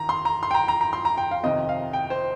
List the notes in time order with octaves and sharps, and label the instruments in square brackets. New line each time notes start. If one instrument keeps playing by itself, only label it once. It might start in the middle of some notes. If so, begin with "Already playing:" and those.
Already playing: [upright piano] D#3 A#5
C6
A#5
C6
G5
A#5
A#5
A#5
C6
A#5
G5
F5
F2 C3 D#3 D#5
F5
G5
C5